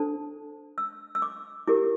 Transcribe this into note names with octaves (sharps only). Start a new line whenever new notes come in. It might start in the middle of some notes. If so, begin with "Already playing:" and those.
Already playing: D4 A4 C5 A5
E6
E6
D6
E4 G4 A#4 D6